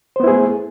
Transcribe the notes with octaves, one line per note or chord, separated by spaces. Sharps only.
A3 B3 E4 G#4 C5